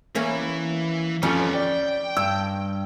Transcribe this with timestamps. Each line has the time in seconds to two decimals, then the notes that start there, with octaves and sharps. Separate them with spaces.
0.15 E3 A#3 C#4
1.23 F2 F3 G3 B3 C#4
1.54 D5 G5
2.17 G2 E6